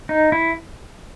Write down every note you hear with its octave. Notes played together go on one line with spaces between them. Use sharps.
D#4
E4